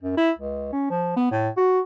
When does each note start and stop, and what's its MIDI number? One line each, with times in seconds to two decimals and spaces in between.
0.02 0.16 42
0.17 0.31 64
0.38 0.70 37
0.72 0.86 61
0.90 1.15 53
1.16 1.27 59
1.31 1.49 45
1.57 1.79 66